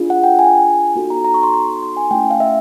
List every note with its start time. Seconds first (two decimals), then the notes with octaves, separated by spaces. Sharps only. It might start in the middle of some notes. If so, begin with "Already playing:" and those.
Already playing: D4 F4 G#4
0.10 F#5
0.24 G5
0.39 G#5
0.96 B3 D#4 F#4 A4
1.10 A#5
1.25 A#5
1.34 C#6
1.43 C6
1.54 C6
1.83 C6
1.97 G#5
2.11 A3 C#4 E4 G5
2.20 F#5
2.31 F5
2.40 E5